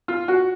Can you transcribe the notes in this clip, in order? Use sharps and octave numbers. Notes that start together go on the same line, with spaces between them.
F4
F#4